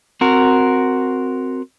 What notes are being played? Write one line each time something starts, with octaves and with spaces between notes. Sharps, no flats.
C4 F#4 A#4